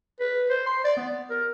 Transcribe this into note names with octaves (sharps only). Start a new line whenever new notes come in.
B4
C5
C6
D5
B3
A#4